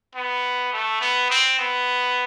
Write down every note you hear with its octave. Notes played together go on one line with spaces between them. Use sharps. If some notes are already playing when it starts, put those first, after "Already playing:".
B3
A3
B3
C4
B3